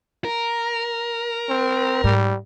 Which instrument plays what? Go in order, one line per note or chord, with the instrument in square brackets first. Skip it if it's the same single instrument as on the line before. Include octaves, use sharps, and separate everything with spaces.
[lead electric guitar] A#4
[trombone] C4
[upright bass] G#2 [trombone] G3